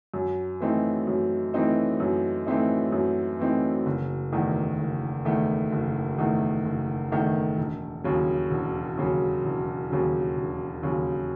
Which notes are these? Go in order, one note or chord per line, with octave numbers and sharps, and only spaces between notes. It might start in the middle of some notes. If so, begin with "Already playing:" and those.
F#2
E3 A3 C4 D#4
F#2
E3 A3 C4 D#4
F#2
E3 A3 C4 D#4
F#2
E3 A3 C4 D#4
F#1
E2 D#3 A3
F#1
E2 D#3 A3
F#1
E2 D#3 A3
F#1
E2 D#3 A3
E1
D#2 C#3 F#3
E1
D#2 C#3 F#3
E1
D#2 C#3 F#3
E1
D#2 C#3 F#3